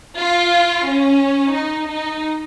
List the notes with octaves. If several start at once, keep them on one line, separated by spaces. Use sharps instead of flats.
F4
C#4
D#4
D#4